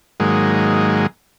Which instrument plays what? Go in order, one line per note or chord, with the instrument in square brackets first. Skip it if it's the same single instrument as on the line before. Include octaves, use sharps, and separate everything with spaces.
[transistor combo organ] G#2 D#3 F#3 G#3 A#3